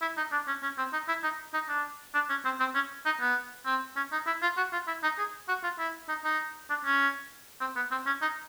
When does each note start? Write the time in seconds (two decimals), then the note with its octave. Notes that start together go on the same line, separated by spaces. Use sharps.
0.02 E4
0.17 D#4
0.32 D4
0.47 C#4
0.63 C#4
0.78 C4
0.93 D#4
1.08 E4
1.23 D#4
1.54 D#4
1.69 D4
2.14 D4
2.30 C#4
2.45 C4
2.60 C4
2.75 C#4
3.06 D#4
3.21 B3
3.66 C4
3.96 C#4
4.12 D#4
4.27 E4
4.42 F4
4.57 F#4
4.73 F4
4.88 E4
5.03 D#4
5.19 G#4
5.48 F#4
5.63 F4
5.79 E4
6.09 D#4
6.24 D#4
6.70 D4
6.85 C#4
7.61 C4
7.76 B3
7.91 C4
8.06 C#4
8.22 D#4